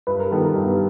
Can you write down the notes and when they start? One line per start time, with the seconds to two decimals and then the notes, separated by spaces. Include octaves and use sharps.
0.07 G2 B4
0.20 A#4
0.31 D#3 G3 B3 A4
0.45 A#4
0.55 G2